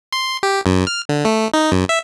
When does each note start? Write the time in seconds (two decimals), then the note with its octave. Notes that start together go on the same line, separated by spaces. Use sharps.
0.13 C6
0.43 G4
0.66 F#2
0.87 F6
1.09 D3
1.25 A3
1.54 D#4
1.72 F#2
1.89 E5